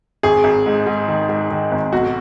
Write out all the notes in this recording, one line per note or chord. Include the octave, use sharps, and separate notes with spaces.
G#1 G#4
G#1
G#2
G#2
D#3
G#2
D#3
G#1
B1 F#4